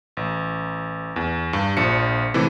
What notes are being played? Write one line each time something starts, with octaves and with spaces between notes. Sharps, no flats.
A1
E2
G2
A#1 F3 D4 C#7
C3 E3 A3 E4